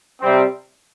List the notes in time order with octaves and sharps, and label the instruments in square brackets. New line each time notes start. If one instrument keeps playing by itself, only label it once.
[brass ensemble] C3 G3 C4